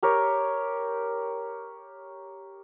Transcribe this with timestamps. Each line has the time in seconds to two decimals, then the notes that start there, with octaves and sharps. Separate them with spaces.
0.03 G4 A#4 C#5